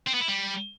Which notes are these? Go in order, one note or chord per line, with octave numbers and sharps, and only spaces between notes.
C4
B3
E4
G3